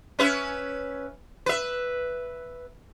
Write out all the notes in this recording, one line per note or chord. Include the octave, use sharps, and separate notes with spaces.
C#4 B4 E5
B4 E5